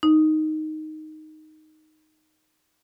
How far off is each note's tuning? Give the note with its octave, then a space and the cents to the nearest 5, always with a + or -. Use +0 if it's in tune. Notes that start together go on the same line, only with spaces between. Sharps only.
D#4 +0